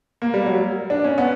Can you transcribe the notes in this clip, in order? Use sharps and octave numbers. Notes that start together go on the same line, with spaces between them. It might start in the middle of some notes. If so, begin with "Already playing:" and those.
A#3
G3
F#3
D4
C#4
B3